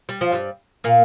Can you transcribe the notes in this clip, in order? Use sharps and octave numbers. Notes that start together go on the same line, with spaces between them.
G3
F3
G2 G3
A#2 A#3